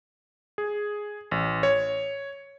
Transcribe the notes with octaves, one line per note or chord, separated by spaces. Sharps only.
G#4
A1
C#5